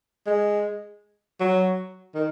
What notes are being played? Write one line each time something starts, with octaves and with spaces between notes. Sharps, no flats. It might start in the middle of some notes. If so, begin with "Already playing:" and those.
G#3
F#3
D#3